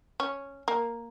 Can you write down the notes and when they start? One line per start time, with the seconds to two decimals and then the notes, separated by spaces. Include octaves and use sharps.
0.20 C#4
0.68 A#3